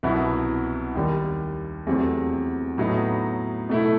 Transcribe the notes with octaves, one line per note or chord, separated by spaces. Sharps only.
C2 B2 F#3 B3 E4
D#2 D#3 G3
E2 C3 F#3 A3 C4
A2 F#3 B3 D#4
B2 A3 E4